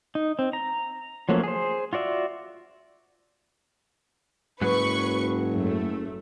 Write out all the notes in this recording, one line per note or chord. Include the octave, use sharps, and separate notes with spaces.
D#4
C4
A#5
F3 F#3 A3 A#3 C#4
G#4 C5
F4 F#4 D5 E5
F#1 G#2 F#3 B4 C#6
F#2 A3